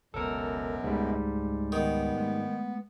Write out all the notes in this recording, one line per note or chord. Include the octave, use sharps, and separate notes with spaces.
F#1 C#2 F#2 B2 F#3 A4 A#4
C#2 G#2 G3 A3
D#3 B3
G#3 A3